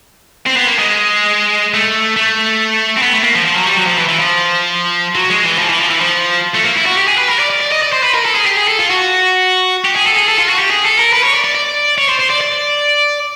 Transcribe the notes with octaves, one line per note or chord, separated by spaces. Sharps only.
C4
B3
A#3
G#3
A3
A3
C4
B3
A3
A#3
F3
F3
F#3
G3
F#3
F3
E3
E3
F3
F#3
G#3
E3
F3
E3
F3
E3
F3
A3
A#3
E4
F#4
G4
G#4
B4
A#4
D5
D5
D5
D#5
D5
C5
B4
A#4
A4
G#4
G4
G#4
A4
F4
F#4
G4
G#4
A4
G#4
A4
F4
F#4
G4
G#4
A4
A#4
B4
C#5
D5
D5
D5
C#5
C5
C5
D5
D5